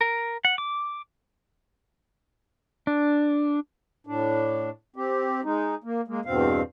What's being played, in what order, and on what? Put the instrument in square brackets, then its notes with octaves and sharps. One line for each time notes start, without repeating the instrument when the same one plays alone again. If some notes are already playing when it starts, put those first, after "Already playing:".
[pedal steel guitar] A#4
F#5
D6
D4
[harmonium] A2 D4
C4 G4
G#3 D#4
A#3
G#3 A#3
E2 G2 B2 C4 F5